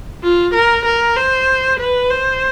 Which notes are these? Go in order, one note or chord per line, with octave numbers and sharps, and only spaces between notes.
F4
A#4
A#4
C5
B4
C5